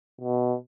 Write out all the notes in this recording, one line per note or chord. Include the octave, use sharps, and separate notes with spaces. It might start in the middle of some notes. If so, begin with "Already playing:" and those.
B2